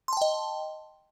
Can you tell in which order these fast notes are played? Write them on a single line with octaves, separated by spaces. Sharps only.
C6 A5 G5 D#5